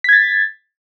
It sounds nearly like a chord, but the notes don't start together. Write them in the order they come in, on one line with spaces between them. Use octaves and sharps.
B6 G#6 A6